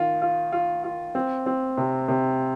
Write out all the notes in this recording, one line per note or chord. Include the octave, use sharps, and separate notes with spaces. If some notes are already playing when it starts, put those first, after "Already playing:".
Already playing: D#3 F4
F4
F4
F4
C4
C4
C3
C3